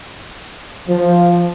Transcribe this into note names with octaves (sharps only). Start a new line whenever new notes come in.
F3